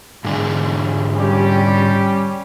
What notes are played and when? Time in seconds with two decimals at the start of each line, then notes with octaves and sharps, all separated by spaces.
0.25 G#2 D3 G#3
1.15 G3 C#4 G4